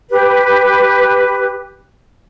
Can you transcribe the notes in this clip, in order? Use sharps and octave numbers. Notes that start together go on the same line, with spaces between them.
G4 B4